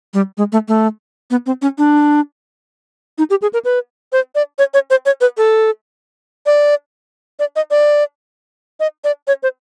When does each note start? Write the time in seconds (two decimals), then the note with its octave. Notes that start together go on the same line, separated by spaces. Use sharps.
0.14 G3
0.38 G#3
0.52 A3
0.68 A3
1.31 B3
1.46 C4
1.62 C#4
1.78 D4
3.18 D#4
3.30 G4
3.42 G#4
3.53 A#4
3.65 B4
4.13 C5
4.35 D5
4.58 C#5
4.74 C#5
4.90 C5
5.06 C#5
5.21 B4
5.37 A4
6.46 D5
7.39 D5
7.56 D#5
7.71 D5
8.80 D#5
9.04 D5
9.28 C#5
9.43 C5